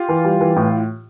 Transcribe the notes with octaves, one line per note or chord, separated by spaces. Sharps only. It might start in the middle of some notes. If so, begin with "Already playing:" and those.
Already playing: F4 G4
E3
G3
E3
A2